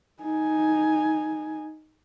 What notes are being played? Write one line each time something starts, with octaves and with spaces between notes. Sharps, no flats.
D#4 G#5